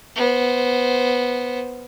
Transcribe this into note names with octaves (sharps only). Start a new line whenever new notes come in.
B3 C5